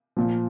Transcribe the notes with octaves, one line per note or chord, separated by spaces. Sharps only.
A#2 F3